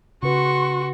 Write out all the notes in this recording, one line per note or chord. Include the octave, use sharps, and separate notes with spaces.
C#3 F#4 B4 C6 C#6